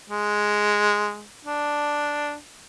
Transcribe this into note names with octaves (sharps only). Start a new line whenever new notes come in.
G#3
D4